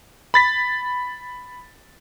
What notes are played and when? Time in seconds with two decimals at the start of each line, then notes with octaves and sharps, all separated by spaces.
0.34 B5 A6 B6